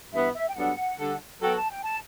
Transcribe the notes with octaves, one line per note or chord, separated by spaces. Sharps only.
G2 E3 B3 E5
E5
G5
G2 F#3 B3 D4 A4 F#5
D3 G3 D4 A4
F#3 B3 F#4 A4 G5
A5
G5
A5